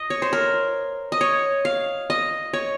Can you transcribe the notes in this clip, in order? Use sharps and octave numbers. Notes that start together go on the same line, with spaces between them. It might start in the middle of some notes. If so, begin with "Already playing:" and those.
Already playing: D#5
C#5
C5
A#4
D#5
C#5
F5
D#5
C#5